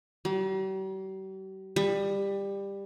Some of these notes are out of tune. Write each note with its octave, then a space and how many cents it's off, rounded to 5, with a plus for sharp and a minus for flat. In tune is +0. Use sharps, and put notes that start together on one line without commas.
G3 -45
G3 +15